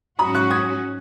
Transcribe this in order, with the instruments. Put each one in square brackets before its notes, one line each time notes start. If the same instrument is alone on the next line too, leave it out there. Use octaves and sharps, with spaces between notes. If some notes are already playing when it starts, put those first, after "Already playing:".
[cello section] G#2 F#3 C#4 F#4 [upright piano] B5 D#6
[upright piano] C#6 F#6
D#6 G#6